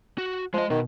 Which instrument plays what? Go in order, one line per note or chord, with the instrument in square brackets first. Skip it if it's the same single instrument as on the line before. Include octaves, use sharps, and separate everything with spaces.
[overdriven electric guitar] F#4
[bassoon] F3 [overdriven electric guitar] G#3 D#5
[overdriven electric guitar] B2 [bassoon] D#3